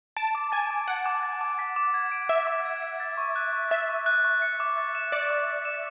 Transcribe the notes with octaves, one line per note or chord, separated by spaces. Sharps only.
A5 D7
D6
G#5 A6
D6
F#5 D7
D6
A6
D6
B6
D6
G#6
D7
E5 B6
D6
G#6
D7
A6
C#6
F#6
C#6
E5 A6
C#6
F#6
C#6
C#7
D6
A6
E7
D5 C#7
D6
A6
E7